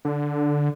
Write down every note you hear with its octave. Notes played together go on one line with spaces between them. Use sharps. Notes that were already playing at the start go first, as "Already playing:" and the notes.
D3